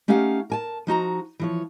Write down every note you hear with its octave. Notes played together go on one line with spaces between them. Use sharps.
A3 C#4 D#4 G4 F5 F#5
A#4 G#5 A5
F3 D#4 F#4 A#5
E3 F3 C#5